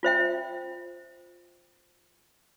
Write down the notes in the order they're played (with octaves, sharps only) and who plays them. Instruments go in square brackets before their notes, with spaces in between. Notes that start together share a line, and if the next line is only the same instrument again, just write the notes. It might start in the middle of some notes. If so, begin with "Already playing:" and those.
[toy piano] F4 C5 E5 G5